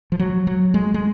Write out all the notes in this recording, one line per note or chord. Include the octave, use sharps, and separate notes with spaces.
F3
F#3
F#3
G#3
G#3